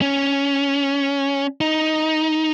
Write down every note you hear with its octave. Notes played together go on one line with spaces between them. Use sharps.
C#4
D#4